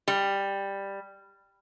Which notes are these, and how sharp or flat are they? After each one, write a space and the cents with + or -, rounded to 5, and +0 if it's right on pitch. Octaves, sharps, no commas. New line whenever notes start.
G3 +10